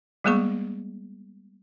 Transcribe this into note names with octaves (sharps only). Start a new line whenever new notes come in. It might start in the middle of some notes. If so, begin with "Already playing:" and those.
G3 G#3 A#3 B3 G#4 C#6